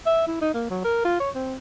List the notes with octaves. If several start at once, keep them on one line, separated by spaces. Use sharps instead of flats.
E5
E4
D#4
A#3
F#3
A#4
F4
C#5
C4